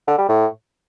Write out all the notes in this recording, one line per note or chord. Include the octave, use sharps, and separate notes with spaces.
D3
G3
A2